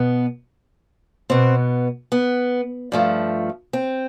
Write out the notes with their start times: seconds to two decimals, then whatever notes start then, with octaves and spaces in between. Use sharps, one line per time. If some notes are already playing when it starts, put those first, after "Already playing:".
Already playing: B2 B3
1.30 B2 B3 C4
2.12 B3
2.92 G2 F3 A3
3.73 C4